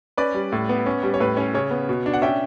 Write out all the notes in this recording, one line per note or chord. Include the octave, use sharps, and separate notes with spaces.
C#4 B4 D5
G3
A2
B3
C#4
G3
C#5
A2 B4
C#4 C#5
C#3 C#5
B3
B2
D4
F#5
C#4 E5 G5